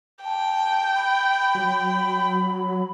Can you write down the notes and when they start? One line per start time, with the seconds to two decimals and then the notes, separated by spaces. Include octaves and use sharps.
0.24 G5 A5
0.95 B5
1.55 F#3